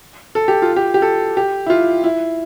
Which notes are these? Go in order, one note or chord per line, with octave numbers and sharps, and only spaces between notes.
A4
G4
F4
G4
G4
A4
G4
E4
F4
E4